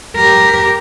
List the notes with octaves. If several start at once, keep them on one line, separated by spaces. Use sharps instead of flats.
G4 A#4